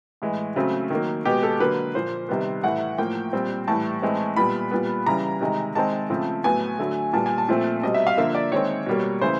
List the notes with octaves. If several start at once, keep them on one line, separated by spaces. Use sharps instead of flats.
A2 E3 G#3
C#3 F#3 A3 C4
D#3 F#3 A#3
B2 G#3 B3 G4
A4
D3 F#3 A#3 B4
A#2 F3 A#3 C5
C3 D#3 G3 B3
A2 E3 A3 F#5
A2 F3 A#3 G5
A#2 G3 C4
A2 E3 G3 A5
A2 E3 G#3 C4
A#2 G3 B3 B5
A#2 G3 B3
C#3 E3 G3 A#5
C3 D#3 G#3
D#3 G#3 C4 A5
C#3 F3 A3 C4
A2 F#3 B3 G#5
D3 F#3 A3
A#2 G3 B3 A5
G#5
A5
A#2 F3 A3 C4
B2 G3 C4 D#5
E5
F5
D3 F3 A#3 E5
D5
D#3 G#3 C4 C#5
B2 G3 A#3
C#3 E3 A3 C5